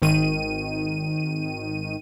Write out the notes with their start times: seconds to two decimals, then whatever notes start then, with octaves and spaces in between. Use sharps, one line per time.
0.02 G#1 D#3 D#7